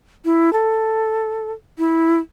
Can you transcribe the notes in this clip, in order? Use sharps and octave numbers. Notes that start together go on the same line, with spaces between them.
E4
A4
E4